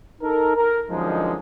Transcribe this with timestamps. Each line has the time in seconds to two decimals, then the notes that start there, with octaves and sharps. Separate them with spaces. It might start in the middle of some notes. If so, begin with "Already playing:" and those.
0.22 D#4 A4 A#4
0.55 A#4
0.90 F#2 D3 F3 G#3 D#4